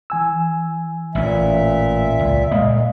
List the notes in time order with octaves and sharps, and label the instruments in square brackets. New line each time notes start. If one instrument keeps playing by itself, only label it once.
[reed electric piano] E3 G#5 E6
[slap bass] A1 C#4 [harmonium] A#2 E5
[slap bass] C#2
[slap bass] A#2 G#3 A#3 [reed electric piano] D#5 F5